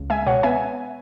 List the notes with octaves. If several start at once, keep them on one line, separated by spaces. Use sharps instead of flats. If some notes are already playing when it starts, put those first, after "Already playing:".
Already playing: C#2
G#3 E5 G#5
B2 C#5 F#5
B3 E5 G#5